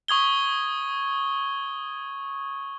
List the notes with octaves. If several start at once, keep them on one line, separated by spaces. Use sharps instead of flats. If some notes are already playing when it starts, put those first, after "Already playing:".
C#6 D#6 G#6 G7